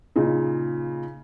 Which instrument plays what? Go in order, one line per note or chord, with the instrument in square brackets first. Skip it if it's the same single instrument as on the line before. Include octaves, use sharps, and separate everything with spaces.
[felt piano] A#2 C#3 D#4